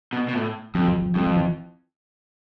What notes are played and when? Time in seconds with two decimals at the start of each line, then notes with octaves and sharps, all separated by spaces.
0.13 B2
0.28 B2
0.34 A2
0.74 F2 F3
0.88 F3
1.02 F3
1.15 F2 G3
1.26 F3
1.36 E3